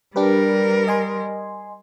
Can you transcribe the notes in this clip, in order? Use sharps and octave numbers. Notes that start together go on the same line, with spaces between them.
G3 D4 G4 A#4 B4
D#5 G#5 C6